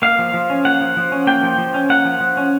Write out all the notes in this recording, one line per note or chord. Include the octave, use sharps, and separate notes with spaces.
A#3 F5
F3
F3
C#4
A#3 F#5
F3
F3
C#4
A#3 G5
F3
F3
C#4
A#3 F#5
F3
F3
C#4